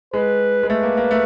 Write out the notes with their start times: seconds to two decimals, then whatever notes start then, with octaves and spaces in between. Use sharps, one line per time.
0.13 G#3 B4
0.63 G#3
0.69 A3 B4
0.83 A#3
0.97 A#3
1.11 A3